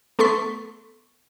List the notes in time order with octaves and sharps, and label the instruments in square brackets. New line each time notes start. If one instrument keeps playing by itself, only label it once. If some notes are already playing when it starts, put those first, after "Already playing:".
[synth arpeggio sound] A3 B3 A4 C6 C#6 B6